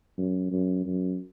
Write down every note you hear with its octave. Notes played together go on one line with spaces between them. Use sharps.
F#2
F#2
F#2